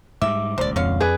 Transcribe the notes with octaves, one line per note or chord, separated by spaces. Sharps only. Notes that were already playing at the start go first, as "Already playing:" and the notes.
G#2 F#3 G3 E5 D6
D#1 C#2 C5 D5
F2 D3 C#5 F5
G#4 B4 D5